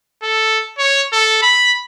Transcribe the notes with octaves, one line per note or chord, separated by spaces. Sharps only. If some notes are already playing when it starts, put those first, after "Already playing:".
A4
C#5
A4
B5